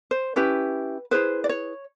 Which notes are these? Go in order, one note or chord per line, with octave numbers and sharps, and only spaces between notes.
C5
C#4 E4 G4 B4
E4 G#4 B4 C5
D5
C#5